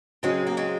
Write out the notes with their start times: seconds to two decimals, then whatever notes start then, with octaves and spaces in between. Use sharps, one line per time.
0.23 C#3 F#3 G#3 C4 C#4
0.47 A#3
0.57 G#3 C4